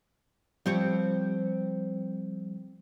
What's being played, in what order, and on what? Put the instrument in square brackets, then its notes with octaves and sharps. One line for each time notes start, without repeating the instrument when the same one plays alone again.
[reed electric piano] F3 G3 [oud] C4 G4 C#5